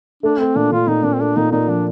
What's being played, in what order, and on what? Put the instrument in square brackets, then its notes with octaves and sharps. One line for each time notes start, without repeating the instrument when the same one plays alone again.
[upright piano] A3 [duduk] D4
[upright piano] A3 [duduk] C4
[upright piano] A#2 [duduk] D4
[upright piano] A#2 [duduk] F4
[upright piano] A#2 [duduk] D#4
[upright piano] A#2 [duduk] D4
[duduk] C4
[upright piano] A3 [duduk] D4
[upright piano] A#2 [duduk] D#4
[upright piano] A#2 [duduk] D#4
[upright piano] F3 [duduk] D4